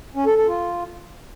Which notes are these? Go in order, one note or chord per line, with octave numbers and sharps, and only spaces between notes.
C#4
A4
A4
F4